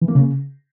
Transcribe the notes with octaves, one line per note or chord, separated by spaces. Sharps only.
E3
A#3
C#3